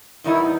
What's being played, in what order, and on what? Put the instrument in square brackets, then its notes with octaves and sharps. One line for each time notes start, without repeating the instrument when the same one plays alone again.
[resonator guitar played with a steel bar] E2 D#3 G3 B3 D#4 [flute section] E4